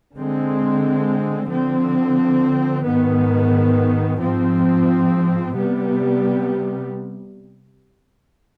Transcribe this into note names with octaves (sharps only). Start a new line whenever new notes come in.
D3 G#3 C4
D3 F3 C4
G#2 D#3 B3
G#2 F3 C4
C3 G3 B3